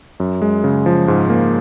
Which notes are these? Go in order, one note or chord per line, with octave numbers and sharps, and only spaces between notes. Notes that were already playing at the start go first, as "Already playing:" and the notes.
F#2
G#3
C#3
F3
G#2
A#3